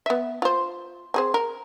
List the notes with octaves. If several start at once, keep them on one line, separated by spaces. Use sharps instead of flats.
B3 E5
F4 C5
C4 G#4 C5
A#4